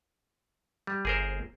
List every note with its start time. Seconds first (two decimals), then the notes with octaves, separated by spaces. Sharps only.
0.87 G3
1.05 G1 G#4 A#4 C5